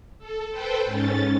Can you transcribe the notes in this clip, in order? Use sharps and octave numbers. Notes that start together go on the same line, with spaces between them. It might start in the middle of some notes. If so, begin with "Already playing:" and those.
A4
A4 B4 C5 G5
G#2 C#4 A6